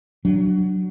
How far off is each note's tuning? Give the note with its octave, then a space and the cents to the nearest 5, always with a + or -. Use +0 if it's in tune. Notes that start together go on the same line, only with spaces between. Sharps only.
F#3 +10 D4 +0